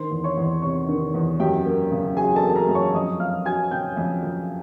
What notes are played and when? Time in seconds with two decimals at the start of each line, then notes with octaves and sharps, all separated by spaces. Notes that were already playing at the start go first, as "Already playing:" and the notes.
Already playing: D#3 C5 C6
0.11 E2
0.24 C#5 C#6
0.37 E2
0.62 C3 C#5 C#6
0.88 D#3
1.14 E2
1.40 F#2 G4 G5
1.66 A#3
1.91 C#3
2.17 F#3 G#4 G#5
2.36 A4 A5
2.43 A#3
2.50 A5
2.56 A#4 A#5
2.68 F#2
2.75 C#5 C#6
2.94 F2 D#5 D#6
3.19 F2 F5 F6
3.45 F#3 G#5 G#6
3.71 C#3 G5 G6
3.97 F2
4.23 F2